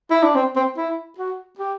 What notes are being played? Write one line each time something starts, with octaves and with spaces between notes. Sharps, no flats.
E4
D4
C4
C4
E4
F#4
G4